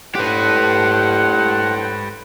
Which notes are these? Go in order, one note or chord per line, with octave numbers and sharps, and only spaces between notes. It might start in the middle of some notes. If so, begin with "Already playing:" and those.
A2 G4 B4 C5 F#5